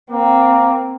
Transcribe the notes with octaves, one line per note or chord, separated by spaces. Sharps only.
A#3 C4